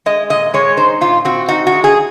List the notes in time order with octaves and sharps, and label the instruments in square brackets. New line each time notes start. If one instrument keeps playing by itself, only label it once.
[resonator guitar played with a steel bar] G#3 D#5
A#2 D#5
G#3 C#5
D#4 C5
A#2 F4
C4 F#4
D#4 F#4
F#4
G#3
G#4